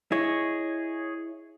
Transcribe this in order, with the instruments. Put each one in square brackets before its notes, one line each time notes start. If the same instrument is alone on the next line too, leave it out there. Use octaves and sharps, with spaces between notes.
[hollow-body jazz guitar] E4 [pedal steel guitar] G#4 C#5 D#5